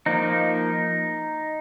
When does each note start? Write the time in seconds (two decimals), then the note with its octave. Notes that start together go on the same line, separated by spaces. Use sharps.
0.06 F3 A#3 D#4